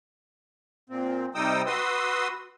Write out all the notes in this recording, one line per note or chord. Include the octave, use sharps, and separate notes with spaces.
A#2 C4
C3 G3 D#4 G5 D#6 E6
F#4 B4 C6 D#6 E6